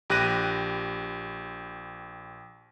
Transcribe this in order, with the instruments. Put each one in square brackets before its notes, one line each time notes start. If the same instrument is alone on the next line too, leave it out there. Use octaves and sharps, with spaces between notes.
[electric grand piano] A#1 G4 D6 F#6 A#6 D#7